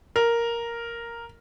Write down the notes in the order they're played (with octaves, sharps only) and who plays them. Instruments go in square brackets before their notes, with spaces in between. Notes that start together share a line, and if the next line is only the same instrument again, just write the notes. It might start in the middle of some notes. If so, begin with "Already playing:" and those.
[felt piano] A#4